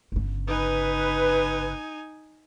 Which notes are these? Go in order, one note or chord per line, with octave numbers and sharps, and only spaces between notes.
G1 C#3
D#4 B4 G#5